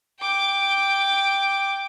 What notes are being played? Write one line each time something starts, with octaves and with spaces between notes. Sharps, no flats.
G5 D6